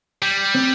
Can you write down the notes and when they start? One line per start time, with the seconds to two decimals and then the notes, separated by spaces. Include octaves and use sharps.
0.23 G3
0.55 C4